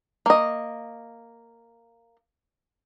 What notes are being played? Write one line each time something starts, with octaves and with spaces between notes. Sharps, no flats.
A#3 D#5